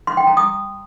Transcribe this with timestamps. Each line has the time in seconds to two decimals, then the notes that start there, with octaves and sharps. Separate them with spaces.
0.07 C6
0.17 G5
0.27 A#5
0.37 D#6